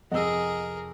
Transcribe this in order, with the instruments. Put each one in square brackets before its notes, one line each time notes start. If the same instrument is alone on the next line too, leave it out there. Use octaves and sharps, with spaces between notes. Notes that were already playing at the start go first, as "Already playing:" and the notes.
[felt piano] F2 C3 E6 [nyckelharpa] G#4 A#4 [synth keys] D#5 F#5